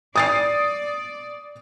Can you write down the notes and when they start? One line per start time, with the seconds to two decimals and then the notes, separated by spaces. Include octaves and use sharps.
0.16 D5 D#6 A6 C7